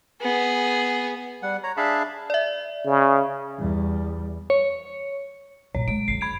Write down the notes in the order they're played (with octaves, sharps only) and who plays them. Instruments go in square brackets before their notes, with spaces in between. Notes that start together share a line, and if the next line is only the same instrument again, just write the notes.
[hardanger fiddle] B3 G#4
[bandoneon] G3 F#5
C#5 A#5
D4 G#4 E5 F5 A5 B5
[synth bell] D5 E5
[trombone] C#3
[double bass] E2 G3
[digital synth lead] C#5
[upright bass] A#1 F#2 [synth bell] C#5
[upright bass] G#3 [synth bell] D7
[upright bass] F#2 D3 [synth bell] C7
[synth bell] B5 G#6 D7